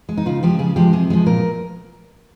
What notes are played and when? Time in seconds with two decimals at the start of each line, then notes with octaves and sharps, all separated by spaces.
0.09 G#3
0.17 D#4
0.26 C#3 F4
0.43 F3 G#3 G4
0.59 C#3 G#4
0.76 F3 G#3 G4
0.93 C3 G#4
1.10 F3 G#3
1.26 A#2 A#4